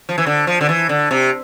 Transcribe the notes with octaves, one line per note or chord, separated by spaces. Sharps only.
F3
E3
D3
F3
D3
E3
D3
C3